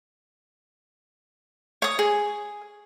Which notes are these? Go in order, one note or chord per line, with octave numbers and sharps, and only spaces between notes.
C#5 D#6
G#4